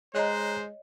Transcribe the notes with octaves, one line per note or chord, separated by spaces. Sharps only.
G#3 C5 C#5 D#5 A#5 F#6